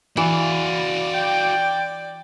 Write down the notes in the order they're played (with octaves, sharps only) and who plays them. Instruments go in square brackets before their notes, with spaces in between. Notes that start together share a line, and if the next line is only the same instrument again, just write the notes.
[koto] E3 [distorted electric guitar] F#4 F5 [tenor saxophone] D5
[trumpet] G5